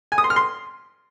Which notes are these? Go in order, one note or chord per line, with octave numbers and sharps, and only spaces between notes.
G#5
D#6
C6
F6
C6